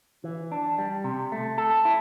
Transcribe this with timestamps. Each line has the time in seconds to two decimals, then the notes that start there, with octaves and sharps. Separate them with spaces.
0.24 E3
0.52 D4
0.78 G3
1.04 C3
1.32 A3
1.58 A4
1.85 E4